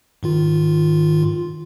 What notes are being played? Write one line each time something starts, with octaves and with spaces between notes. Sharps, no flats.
G#2 D#3 F4